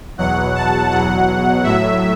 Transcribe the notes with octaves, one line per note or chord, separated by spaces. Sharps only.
E2 B2 F#3 F#5
A5
E2 B2 F#3 F#5
A2 F#3 E5